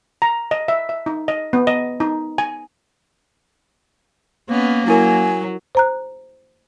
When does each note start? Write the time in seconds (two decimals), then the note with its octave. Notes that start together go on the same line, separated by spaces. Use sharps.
0.22 A#5
0.51 D#5
0.68 E5
0.89 E5
1.06 D#4
1.28 D#5
1.53 B3
1.67 D#5
2.00 D#4
2.38 G#5
4.50 A#3 B3 C#4
4.88 F#3 E4 A#4 G#5
5.75 C5 A#5 F#6